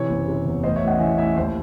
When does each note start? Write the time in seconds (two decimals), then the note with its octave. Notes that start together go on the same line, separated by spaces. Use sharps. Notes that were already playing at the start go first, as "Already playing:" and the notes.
Already playing: C3 E3 C#5
0.10 F#1
0.28 C3
0.46 E2
0.63 A1 C5 D#5
0.76 C#5 E5
0.82 A1
0.87 D#5 F#5
0.99 E3 E5 G#5
1.18 A2 E5 G#5
1.36 D#2 C5